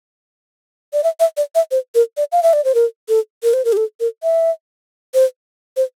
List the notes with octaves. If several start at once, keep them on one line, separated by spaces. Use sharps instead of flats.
D5
E5
E5
D5
E5
C5
A#4
D5
F5
E5
D5
C5
A#4
A4
A#4
C5
A#4
G4
A4
A#4
E5
C5
C5